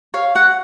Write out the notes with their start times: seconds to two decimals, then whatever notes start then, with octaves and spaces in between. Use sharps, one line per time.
0.14 C#5 F5
0.35 F#4 F#5